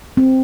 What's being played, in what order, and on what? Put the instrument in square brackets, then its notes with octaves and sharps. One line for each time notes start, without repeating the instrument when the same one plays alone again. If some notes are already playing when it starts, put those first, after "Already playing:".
[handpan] C4